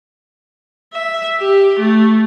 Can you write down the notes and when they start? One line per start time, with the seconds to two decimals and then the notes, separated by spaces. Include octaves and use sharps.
0.93 E5
1.39 G4
1.80 A3